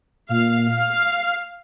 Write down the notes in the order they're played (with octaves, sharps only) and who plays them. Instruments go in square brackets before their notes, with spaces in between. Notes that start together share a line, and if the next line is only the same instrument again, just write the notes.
[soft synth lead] A#2 [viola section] F5
[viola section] F5